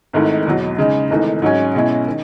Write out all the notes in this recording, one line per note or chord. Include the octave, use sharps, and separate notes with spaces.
G#1 G#2 D#3 A3 E4
E2 B2 F#3
C#3 G#3 D#4
G#1 G#2 E3 A3 D#4
G#2 F#3 C#4
B1 B2 G#3 C#4 E4
D#3